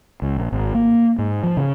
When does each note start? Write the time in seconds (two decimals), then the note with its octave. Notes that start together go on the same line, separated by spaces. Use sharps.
0.22 C#2
0.36 A#1
0.52 G#1
0.74 A#3
1.18 G#2
1.43 F3
1.57 C#3